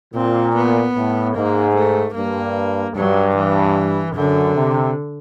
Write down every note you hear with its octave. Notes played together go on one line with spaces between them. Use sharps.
A#2 C4
B3
A2
G#2 A#3
A3
G2 A#3
G2 F#3
E3
F#2 D3
C3